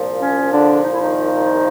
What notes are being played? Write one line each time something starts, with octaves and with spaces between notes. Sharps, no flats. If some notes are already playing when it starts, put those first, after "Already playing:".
Already playing: C2 A#2 F3
C#4
D3 D4
D#4
E4
D#3 D#4